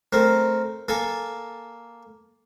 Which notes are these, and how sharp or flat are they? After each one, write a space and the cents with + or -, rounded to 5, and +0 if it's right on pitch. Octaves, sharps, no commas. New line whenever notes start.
A3 +0 C4 +0 A#4 +0
A#3 +0 A4 +0 G#5 +0